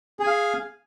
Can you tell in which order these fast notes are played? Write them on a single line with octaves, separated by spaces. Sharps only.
G#4 G#5 F5